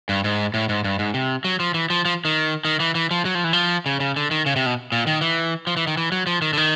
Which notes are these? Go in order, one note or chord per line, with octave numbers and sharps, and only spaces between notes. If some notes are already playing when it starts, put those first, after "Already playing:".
G2
G#2
A2
G#2
G2
G#2
C3
F#3
F3
E3
F3
F3
D#3
D#3
E3
E3
F3
F#3
F3
E3
F3
C#3
C#3
D3
D#3
C#3
C3
B2
A#2
D#3
E3
F3
E3
D#3
E3
F#3
F3
D#3
D3
D#3